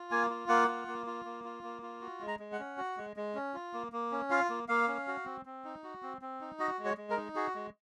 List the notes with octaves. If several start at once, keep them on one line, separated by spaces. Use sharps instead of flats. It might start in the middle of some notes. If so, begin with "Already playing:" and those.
Already playing: F4
A#3 G#5
F4
A#3 F#5
F4
A#3
F4
A#3
F4
A#3
F4
F#4
G#3
A#5
G#3
F#5
C#4
F#4
G#3
G#3
C#4
F4
A#3
A#3
C#4
F4 F5
A#3
A#3 F5
C#4
F#4
C4
C4
D#4
F#4
C4
C4
D#4
F#4 D#5
G#3
C#5
G#3
A#4
D#4
F#4 G#4
G#3